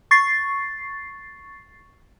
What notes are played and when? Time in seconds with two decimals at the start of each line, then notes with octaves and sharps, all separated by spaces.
0.11 C#6 A6 C7